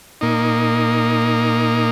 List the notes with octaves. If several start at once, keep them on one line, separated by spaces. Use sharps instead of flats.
A#2 A#3 D#4